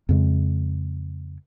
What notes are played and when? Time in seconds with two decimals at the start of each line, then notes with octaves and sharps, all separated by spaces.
0.09 F2 C#3 G#3